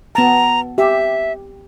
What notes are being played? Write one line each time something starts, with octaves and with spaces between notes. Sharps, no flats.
B3 A5 A#5
G4 E5